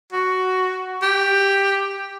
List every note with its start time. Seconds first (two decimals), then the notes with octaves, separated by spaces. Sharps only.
0.12 F#4
1.02 G4